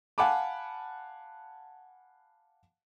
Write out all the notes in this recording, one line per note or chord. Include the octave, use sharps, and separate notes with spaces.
F5 F#5 G#5 A5 B5 D6